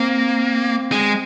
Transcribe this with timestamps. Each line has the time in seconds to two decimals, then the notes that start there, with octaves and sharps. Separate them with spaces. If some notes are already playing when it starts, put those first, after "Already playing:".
Already playing: A#3 C4
0.92 G#3